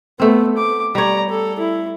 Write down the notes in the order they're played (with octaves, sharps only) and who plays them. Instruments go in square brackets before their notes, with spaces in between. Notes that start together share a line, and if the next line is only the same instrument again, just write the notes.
[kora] A3 C4 [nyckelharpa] B3
[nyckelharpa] D6
[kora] G3 C#5 [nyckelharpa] D5 A#5
[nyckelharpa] A4
E4